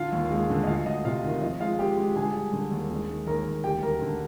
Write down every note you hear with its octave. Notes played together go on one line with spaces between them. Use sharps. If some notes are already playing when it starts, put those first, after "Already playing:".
Already playing: D3 F4 F5
D#2
G#3
D3
D#5
D2 F4 F5
D2 D#5
C3 F4 F5
D#3
F3 D#5
G#3 F4 F5
G#3 G4 G5
G#3
D3 G#4 G#5
G3
D3
D#2
G#3
D#3
D#2 A#4 A#5
D#2
D2 G4 G5
D2 A#4 A#5
D3